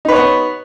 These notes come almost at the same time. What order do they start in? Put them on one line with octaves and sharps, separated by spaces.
D#4 B4 C#5 B3